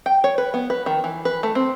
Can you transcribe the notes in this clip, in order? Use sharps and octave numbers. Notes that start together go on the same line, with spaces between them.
G5
C#5
B4
B3
B4
D#3
E3
B4
A3
C4